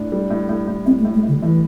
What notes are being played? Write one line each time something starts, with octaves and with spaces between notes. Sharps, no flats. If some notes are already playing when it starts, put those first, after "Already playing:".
Already playing: A2 D4
G3
A2
A2
A2
A2 C4
A3
A2
A3
A2 D3
A2 E3